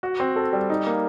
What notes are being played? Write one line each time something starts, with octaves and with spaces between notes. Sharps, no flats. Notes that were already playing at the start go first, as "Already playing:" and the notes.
F#4
C4
A4
G3
D#4
A#3